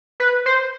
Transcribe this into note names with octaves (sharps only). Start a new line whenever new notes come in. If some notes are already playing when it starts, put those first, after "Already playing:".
B4
C5